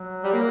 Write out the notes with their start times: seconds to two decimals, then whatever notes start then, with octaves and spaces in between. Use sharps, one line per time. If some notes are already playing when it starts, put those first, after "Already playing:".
Already playing: F#3
0.23 G3
0.33 A#3